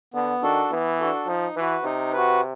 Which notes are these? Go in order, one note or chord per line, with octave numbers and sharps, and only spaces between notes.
D3 B3
D#3 D4 F#4 A4
E3 B3
D4 F#4 A4
F3 D#4
E3 F#4 B4
C3 D#4
F#4 B4